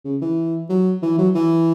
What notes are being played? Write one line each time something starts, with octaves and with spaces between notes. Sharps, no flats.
C#3
E3
F#3
E3
F#3
E3